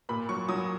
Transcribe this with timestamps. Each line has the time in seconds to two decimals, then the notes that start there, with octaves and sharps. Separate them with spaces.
0.09 A#2 B5
0.29 F#3 C#6
0.49 F#3 D#6